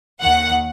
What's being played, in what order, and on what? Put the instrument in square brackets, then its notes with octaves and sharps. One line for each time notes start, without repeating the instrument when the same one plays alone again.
[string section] D#2 D#3 F#5